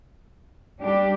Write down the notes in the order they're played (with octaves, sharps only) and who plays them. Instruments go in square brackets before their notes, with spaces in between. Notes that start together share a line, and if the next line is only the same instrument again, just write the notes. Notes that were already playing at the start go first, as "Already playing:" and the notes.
[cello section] G3 D4 G4